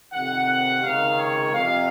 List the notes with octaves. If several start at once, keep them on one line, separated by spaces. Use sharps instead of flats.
F2 C3 D#3 F#5
F#5
C#2 C3 D#3 F5
C#5
F2 C3 F3 F5